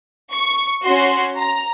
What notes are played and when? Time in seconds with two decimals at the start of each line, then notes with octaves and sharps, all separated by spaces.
0.33 C#6
0.84 C#4 F#4 C6
1.37 A#5